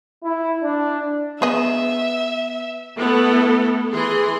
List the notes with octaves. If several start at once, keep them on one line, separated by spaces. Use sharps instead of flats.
E4
D4
B3 G#4 D#5 E5
A3 B3 E4 A4
E3 G#4 C6